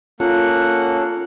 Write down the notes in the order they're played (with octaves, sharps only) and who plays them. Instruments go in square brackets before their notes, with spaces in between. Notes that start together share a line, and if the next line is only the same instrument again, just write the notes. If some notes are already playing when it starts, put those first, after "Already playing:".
[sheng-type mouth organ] A#3 F#5 [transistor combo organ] C#4 A4 [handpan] F4